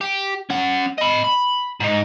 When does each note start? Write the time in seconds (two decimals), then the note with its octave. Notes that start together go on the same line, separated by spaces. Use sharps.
0.01 G4
0.50 C#4 F#5
0.98 D#5 B5
1.24 B5
1.80 G#2 D#4